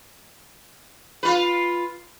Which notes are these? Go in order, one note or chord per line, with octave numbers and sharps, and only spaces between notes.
F4 B4